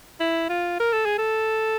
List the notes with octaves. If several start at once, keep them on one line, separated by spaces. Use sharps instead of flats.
E4
F4
A#4
A4
G#4
A4